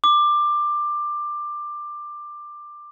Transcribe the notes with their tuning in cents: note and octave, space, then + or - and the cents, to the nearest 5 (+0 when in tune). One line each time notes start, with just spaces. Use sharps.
D6 +15